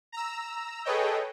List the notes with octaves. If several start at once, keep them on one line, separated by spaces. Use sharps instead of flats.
A#5 E6
G#4 A4 B4 C#5 D#5 G5